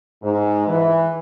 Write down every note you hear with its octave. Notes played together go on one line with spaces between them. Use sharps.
G#2
E3